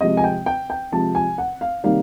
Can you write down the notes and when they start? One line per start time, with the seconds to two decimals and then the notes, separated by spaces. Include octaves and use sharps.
0.01 C3 F3 G#3 D#5
0.17 G#5
0.24 G5
0.46 G5
0.70 G5
0.92 C3 F3 G#3 A5
1.15 G#5
1.38 F#5
1.61 F5
1.84 C3 D#3 G3 A#3 D#4 F5